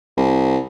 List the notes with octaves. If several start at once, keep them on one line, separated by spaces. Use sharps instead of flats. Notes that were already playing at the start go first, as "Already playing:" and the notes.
C2